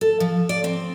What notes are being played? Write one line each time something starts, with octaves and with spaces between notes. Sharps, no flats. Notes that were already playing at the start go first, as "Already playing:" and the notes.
A4
F3
D5
C4